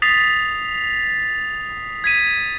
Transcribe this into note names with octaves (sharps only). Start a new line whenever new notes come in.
D#6 A6 B6 C7 F7
G#6 B6 D#7